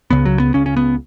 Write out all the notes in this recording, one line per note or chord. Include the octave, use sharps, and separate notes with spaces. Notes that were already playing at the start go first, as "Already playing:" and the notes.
C#2 C#3 B3
F#3
B3
C#2 C#3 C#4
C#4
B3